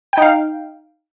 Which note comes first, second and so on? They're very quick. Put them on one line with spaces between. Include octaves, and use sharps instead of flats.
G5 D#4 F5